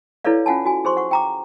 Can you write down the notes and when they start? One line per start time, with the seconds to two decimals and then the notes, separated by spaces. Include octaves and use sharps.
0.25 E4 A4 B4 C#5 D5 F5
0.46 C#4 F4 F#5 G#5 A5
0.65 F#4 G#5
0.85 G#4 C5 C6 C#6
0.97 F#5 C#6
1.11 G5 A#5 D6